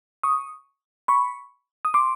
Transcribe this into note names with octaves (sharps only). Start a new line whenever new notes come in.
C#6 D#6
B5 C#6
D#6
C6 D6